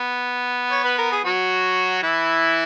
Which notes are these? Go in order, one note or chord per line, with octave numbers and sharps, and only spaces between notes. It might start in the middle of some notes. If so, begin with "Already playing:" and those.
Already playing: B3
C#5
B4
A#4
G#4
F#3 F#4
E3 E4